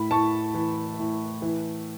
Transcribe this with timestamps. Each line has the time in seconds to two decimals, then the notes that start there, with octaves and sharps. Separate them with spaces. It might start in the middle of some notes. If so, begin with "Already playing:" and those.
Already playing: A2 B5
0.11 A2 A5 C#6
0.54 E3
0.99 A2
1.42 E3